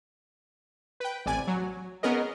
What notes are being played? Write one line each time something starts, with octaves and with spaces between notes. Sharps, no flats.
B4 G5
A1 C3 D5 G#5
F#3
B3 C#4 G#4 A#4 D#5